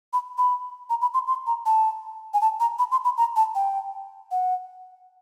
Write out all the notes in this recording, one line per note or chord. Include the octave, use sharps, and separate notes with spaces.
B5
B5
A#5
B5
C6
C6
A#5
A5
G#5
A5
A#5
B5
C6
B5
A#5
A5
G5
F#5